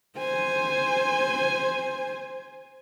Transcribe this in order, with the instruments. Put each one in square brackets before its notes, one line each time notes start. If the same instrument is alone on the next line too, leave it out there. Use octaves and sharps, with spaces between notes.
[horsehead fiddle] C5 G#5